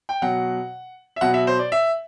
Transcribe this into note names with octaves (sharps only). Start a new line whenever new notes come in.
G5
B2 F#3 F#5
E5
B2 F#3 F#5
E5
C5
D5
E5